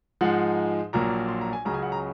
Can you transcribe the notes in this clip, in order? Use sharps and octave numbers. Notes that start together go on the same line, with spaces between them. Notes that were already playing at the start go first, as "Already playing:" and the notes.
G#2 F3 G#3 D#4 F#5
A#1 A#2 F#3 A#3 A#5
C6
A#5
G#5
C#2 C#3 F#3 C#4 A#5
G#5
F#5
A#5